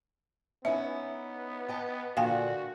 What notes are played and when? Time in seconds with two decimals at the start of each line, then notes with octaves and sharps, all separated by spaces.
0.65 B3 C#4 D#4 E4 E5
1.68 D#5 G5 A5
2.17 A#2 D3 F#4 F5 G5 G#5